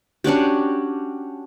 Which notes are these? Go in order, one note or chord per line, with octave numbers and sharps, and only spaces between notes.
C#4 D4 F#4 G4